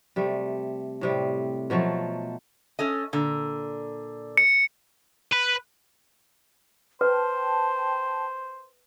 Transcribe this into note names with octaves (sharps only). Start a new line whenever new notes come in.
C3 G3 A3
A2 C3 G3
B2 F3 F#3 A3
C#4 A4 D#5
A#2 D3
C#7
B4
B4 C5 G5 A5